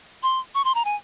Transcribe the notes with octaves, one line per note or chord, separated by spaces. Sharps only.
C6
C#6
C6
A#5
G#5